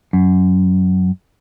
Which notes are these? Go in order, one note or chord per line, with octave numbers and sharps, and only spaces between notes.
F#2